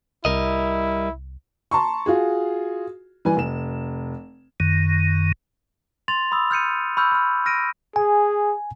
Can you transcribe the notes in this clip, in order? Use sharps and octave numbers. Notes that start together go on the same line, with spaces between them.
C2 G3 E4 A#4 D#5
A5 A#5 C6 C#6
F4 F#4 G#4
E3 G3 B4 G#5
F1 E7
F#2 D#3
C6 A6 F7
B5 D#6 E6
F6 G6 C#7 D#7
B5 C#6 E6 F6 G6
B5 F6
F6 A#6 D7 D#7
G#4 G#5